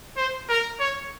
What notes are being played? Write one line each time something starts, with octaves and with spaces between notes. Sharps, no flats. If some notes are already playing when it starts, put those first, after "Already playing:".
C5
A#4
C#5